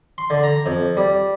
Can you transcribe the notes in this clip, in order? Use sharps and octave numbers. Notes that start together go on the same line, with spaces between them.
C6
D3
A#5
F2
G3